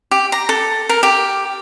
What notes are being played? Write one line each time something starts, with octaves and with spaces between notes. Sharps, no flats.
G4
A#5
A4
A#4
G4